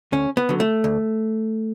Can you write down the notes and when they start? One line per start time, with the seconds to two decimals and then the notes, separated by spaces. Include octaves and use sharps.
0.12 D2 C#4
0.37 B3
0.49 D3 F#3
0.60 A3
0.84 D2